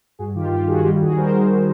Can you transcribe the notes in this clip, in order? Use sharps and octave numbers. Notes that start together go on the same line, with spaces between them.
G2 F#4 G#4
D#3 F4 G4
G2 F4 G4
D#3 F#4 G#4
G3 F4 G4
D#2 F#4 G#4
G3 A#4 C5